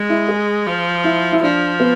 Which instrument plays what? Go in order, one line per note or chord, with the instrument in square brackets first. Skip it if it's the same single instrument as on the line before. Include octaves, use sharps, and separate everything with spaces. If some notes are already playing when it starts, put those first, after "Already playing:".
Already playing: [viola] G#3
[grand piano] E4
G#4
[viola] F3
[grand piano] E4
E4
[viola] F3 [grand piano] D4
[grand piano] B3